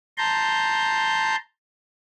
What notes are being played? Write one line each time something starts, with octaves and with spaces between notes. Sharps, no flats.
A5 A#5 C6 G6